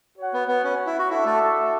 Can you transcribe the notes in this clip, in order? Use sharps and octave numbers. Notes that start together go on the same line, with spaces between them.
F#4 C#5 F#5
B3
B3
C#4
E4
F#4
D4 E4 F#4 A4 E5
A3